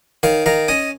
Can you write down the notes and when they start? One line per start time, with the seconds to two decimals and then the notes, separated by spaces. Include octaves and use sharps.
0.23 D#3 C#5 F5
0.46 D#3 F5 A#5
0.68 C#4 D#5 G#5